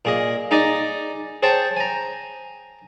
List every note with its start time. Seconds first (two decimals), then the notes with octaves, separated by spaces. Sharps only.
0.05 A#2 G#4 D#5
0.51 D#4 G#4 D5 D#5
1.43 G#4 C5 C#5 G5 A5
1.77 G#5 A#5